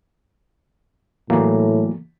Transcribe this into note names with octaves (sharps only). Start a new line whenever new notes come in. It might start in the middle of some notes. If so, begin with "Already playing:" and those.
A2 E3 F#3 A#3